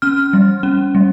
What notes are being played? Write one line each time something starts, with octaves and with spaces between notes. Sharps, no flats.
C#4 F6
G3
C#4
G3